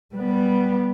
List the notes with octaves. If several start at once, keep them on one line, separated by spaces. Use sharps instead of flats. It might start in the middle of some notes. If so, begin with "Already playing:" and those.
G3 B3